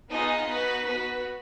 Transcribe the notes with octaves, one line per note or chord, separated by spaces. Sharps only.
B3 D#4 F4 G#4 D#5
B3 D#4 F#4 B4
B3 F#4 B4